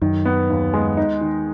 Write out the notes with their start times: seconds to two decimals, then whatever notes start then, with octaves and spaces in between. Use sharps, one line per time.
0.02 F#2 D#3
0.25 B3
0.50 D#2
0.73 G#3
0.97 D#4
1.21 D#3